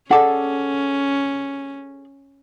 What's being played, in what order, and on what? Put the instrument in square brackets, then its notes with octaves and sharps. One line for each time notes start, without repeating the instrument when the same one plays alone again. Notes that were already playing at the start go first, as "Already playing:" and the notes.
[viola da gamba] C#4 [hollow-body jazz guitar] G#4 A4 D5 [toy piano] F#5 D6